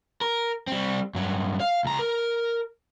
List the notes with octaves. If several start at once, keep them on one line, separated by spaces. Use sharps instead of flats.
A#4
G3 C4
G2 F#3
F5
C#2 A#5
A#4